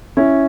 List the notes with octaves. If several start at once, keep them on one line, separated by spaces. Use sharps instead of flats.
C#4 E4